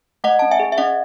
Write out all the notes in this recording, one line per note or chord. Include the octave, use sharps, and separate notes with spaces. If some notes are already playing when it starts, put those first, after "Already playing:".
A3 D#5 F#5
C#4 A5
E5 G#5
G#4
E5
C#4 D#5 F#5